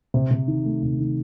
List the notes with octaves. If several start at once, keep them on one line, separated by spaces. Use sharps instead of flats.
C3
C3
D#3
A3
C3
D#3